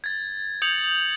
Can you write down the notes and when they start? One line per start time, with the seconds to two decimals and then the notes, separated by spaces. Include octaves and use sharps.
0.04 G#6 A6
0.62 D#6 G6 G#6 C#7 F7 F#7